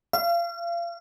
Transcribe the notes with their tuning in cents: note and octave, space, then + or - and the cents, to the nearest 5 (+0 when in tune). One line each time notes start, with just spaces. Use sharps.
F5 -35